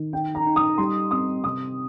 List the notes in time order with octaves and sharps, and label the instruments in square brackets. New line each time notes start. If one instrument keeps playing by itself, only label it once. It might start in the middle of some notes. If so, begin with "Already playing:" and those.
Already playing: [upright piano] D#3
D#4 G5
A#5
D#4
D#6
G3 C6
C4 D#6
C3 D#6